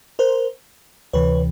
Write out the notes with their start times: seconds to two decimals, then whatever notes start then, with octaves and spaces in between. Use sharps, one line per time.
0.19 A#4 C5
1.13 D2 C3 E3 B4 C#5